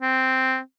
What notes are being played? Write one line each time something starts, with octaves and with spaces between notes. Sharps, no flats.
C4